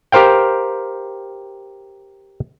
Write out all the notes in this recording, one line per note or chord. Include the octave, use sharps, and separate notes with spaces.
G4 A#4 C5 F5 G5